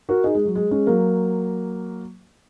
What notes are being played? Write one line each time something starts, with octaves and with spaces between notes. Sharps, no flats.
F#4 A#4
D#4 G#4
G#3
F#3
G#3
G#3 C#4
F#3 A#3